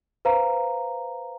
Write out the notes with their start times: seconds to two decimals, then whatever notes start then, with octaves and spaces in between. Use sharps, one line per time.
0.25 B4 C5 F5 A#5